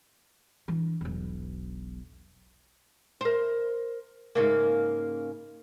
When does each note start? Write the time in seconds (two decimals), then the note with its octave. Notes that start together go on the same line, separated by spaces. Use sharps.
0.68 E3 D4
1.01 E1 B1
3.21 A#4 C5
4.35 G#2 C#3 A#3